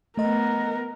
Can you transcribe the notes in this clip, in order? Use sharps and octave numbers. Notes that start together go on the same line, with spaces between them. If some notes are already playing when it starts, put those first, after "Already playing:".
A3 B3 A#4 D#5